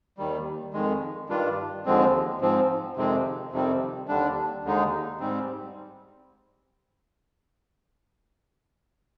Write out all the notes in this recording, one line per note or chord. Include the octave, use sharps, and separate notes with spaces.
D#2 D#3 G3
F2 D#3 G#3
G2 D#3 G3 D4 F4
D#2 D3 F3 G#3 C4
G#2 F3 C4
F2 C3 D#3 G#3 C4
F2 C3 D#3 G3 C4
D#2 D3 G3 D4
D#2 D3 G#3 D#4
G#2 G3 C4